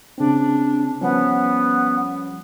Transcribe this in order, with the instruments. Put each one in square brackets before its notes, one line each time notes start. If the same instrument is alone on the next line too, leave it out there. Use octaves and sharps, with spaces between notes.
[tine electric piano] C#3 C4 [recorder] D4
[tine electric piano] F3 G3 C#4 [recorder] B3